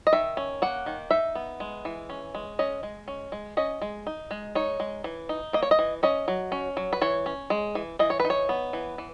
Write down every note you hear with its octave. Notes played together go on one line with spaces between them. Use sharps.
D#5
D#3 E5
C#4
A#3 F#5
D#3
D#4 E5
B3
G#3
E3
C#4
G#3
C#4 D#5
G#3
C#4
G#3
C#4 D#5
G#3
D#4
G#3
D#4 C#5
G#3
E3
D#4
A#3 D#5
C#5
D#5
E3
C#4 D#5
F#3
C#4
F#3
B4
E3 C#5
C#4
G#3
E3
E3 D#5
C#5
D#4 B4
C#5
B3
E3
E3